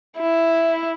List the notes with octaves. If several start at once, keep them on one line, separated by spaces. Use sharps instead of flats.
E4